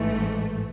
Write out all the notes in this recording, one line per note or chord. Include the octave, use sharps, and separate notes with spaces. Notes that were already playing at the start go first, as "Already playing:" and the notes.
Already playing: A1 G#2 E3 A3